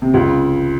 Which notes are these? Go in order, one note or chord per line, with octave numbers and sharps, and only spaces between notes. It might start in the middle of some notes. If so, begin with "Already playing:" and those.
C3
C#2 C#3